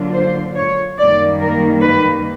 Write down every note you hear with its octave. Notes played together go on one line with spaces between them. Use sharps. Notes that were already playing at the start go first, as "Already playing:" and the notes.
Already playing: D3 F#3 A#3 D4 F4
C5
C#5
F#2 D#3 G3 A#3 D5
A#4
B4